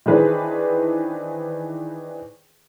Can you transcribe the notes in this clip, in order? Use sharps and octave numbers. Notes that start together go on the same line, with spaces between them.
D#3 E3 D4 G#4 B4 C5